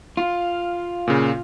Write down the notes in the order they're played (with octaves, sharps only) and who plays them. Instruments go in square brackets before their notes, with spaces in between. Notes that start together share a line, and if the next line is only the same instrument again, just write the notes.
[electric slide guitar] F4 [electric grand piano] F5
[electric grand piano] A#2 C#3